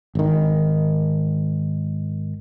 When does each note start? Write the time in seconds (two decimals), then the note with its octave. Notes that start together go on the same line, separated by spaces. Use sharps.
0.15 G#1 D#3